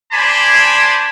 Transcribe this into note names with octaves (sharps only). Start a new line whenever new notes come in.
D4 C5 D5 G#5 A5 B5